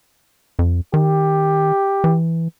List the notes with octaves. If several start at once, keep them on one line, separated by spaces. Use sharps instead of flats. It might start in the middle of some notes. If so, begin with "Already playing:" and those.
F2
D#3 G4
E3